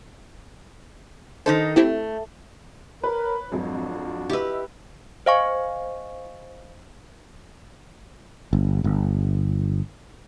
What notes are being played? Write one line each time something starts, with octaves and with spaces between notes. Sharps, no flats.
D#3 D#4 A4 C5
A3 C4 E4 G4
A#4 B4 C#5
G#1 F2 F#3 D4 F4 F#4
E4 G4 B4 D#5 E6
C5 D#5 F5 G#5 C#6
G1
G1